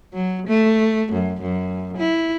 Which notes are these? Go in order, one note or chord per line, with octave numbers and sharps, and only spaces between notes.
F#3
A3
F#2
F#2
E4